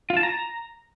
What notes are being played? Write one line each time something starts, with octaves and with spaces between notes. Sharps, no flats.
F4
A5
A#5